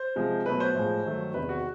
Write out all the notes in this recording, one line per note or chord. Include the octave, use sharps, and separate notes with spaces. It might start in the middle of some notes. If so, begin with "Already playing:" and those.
Already playing: C5
C3 F3 G#3
B2 F#3 A3 B4
C5
A2 F3 G#3
G2 D#3 F#3 A3
E2 C3 D#3 B4
F#4